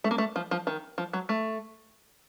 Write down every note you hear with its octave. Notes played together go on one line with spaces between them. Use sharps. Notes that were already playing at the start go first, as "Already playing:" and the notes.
A3
A#3
A3
F3
F3
D#3
F3
F#3
A3